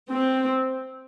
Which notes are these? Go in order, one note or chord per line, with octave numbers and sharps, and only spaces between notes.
C4